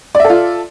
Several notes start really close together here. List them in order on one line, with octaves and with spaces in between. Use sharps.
D5 E5 A4 F4